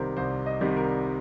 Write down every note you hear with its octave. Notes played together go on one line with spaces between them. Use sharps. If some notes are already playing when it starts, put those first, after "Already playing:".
Already playing: C2 C3 D#3 G3 A#4 C5
C2 C5
D#5
C3 D#3 G3
A#4